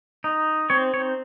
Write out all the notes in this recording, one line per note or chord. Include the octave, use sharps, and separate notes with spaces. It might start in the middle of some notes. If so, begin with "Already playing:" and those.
D#4
C4 C#5
C#5